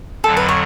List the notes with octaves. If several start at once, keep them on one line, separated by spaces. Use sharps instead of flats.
F2 D3 F#3 A4
B4
C#5